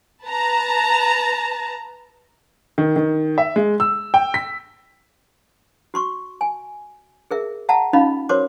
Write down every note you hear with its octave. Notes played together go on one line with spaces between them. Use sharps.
B4 A5 A#5
D#3
D#3
E5
G#3
E6
G5
B6
F#4 C6 C#6
G#5
G#4 A#4 E5
E5 F#5 A5 A#5
C#4 D#4 F4 D#5 F5 B5
F#4 A#4 C5 C#5 C6 D6